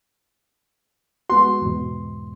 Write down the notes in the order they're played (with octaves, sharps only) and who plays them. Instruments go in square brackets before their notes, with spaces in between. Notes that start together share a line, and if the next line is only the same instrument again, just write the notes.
[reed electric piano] G#3 B3 F#4 [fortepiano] C6
[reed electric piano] E2 G#2 B2